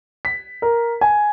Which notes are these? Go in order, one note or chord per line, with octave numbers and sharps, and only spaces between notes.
B6
A#4
G#5